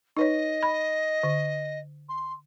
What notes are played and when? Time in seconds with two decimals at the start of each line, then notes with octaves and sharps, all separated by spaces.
0.17 D#4 B4 C#5 D#5
0.63 B5
1.23 D3
2.08 C6